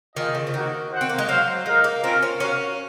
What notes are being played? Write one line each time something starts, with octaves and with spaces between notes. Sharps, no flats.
D#3 A#3 F4 G#4 D#5
C#3
F3
D#3 A#3 D#4 F#4
F#4 C5 F#5
C4
A#3
G#3
F#3 F#4 C5 F5
G#3 D#4 A#4 F5
A#3
C4 C#4 F4 A#4
C#4
C#4 F#4 A#4 C#5 F5